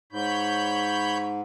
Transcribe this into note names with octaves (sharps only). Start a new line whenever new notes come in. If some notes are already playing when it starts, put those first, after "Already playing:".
G#2 C#5 B5 G6